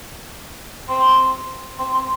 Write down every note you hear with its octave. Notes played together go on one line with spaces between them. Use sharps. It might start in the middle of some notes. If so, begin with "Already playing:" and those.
C4
C4
C4